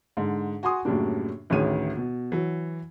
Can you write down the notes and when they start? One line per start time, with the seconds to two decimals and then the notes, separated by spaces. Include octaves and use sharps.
0.17 G#2 D3
0.63 F#4 G#5 C6 D#6
0.85 F#2 A2 C#3 G3 A#3 D4
1.50 A1 D2 D#3 G#4 C#5 D#7
1.97 B2
2.32 E3 F#3